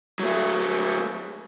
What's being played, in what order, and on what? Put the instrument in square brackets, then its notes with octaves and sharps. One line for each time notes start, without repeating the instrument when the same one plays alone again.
[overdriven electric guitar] F#3 A3